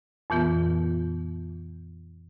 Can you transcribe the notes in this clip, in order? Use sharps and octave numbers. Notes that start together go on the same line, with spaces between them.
F2 A#2 E3 B3 F4